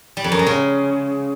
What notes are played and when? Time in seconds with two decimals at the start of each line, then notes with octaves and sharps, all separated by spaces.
0.17 G3
0.24 F2
0.32 F#2
0.39 G#3
0.47 C#3